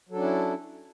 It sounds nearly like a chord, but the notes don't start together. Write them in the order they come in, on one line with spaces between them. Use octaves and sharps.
F#3 A4 D4 C#4 E4